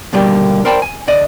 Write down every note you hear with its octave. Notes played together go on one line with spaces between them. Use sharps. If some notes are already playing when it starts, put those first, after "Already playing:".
D#2 B2 D3 G3 A#3 G4
A#4 C5 D5 G5 A5 B5
G#5
D3 D5 D#5